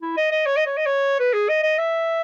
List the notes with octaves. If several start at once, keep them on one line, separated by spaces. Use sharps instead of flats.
E4
D#5
D#5
C#5
D#5
C#5
D#5
C#5
B4
G#4
D#5
D#5
E5